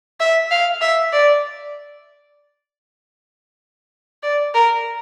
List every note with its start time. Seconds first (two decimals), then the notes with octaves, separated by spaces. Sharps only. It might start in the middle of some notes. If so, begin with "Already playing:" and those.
0.20 E5
0.51 F5
0.81 E5
1.13 D5
4.23 D5
4.55 A#4